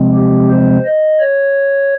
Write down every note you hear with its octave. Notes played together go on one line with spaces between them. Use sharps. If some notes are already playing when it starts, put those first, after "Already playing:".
Already playing: C3 F3 G#3 C4
G4
C5
D#5
C#5